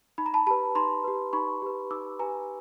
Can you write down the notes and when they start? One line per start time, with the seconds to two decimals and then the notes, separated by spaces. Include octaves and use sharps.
0.18 D#4 B5
0.26 A#5
0.34 A5 B5
0.47 G4 A5 B5
0.51 B4
0.75 D#4 A#5 C6
1.04 G4 B4
1.33 D#4 B5 C#6
1.62 G4 B4
1.91 D#4 D6 E6
2.19 G4 B4 G#5 A#5